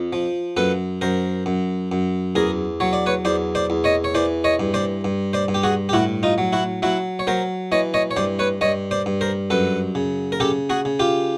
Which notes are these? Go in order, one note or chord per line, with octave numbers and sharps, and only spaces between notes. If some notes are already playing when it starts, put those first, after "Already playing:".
Already playing: F2
F3
F#2 A4 B4
F#2 A#4 C5
F#2
F#2
E2 G#4 A#4
F#3 C#5
D5
B4 C#5
E2 C5 D5
C5 D5
E2
C#5 D#5
C#5
E3 C5 D5
C#5 D#5
G2
C5 D5
G2
C5 D5
G2
G4
F#4 G#4
G4
A2 E4 F#4
D#4 F4
F#3
E4 F#4
F#3 E4 F#4
C#5
F#3 A#4 C5
E3 C#5 D#5
C#5 D#5
C#5
G2 C5 D5
B4 C#5
G2 C#5 D#5
C5 D5
G2
A#4 C5
F#2 A4 B4
C#3
A#4
C#3 G4 A4
F#4 G#4
C#3
F4 G4